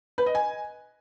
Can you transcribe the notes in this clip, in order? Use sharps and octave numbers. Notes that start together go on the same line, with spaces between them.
B4
D#5
G#5